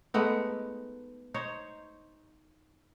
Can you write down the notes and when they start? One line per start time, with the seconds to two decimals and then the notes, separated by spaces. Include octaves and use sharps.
0.14 G#3 A3 B3 D#4
1.34 D#4 C5 C#5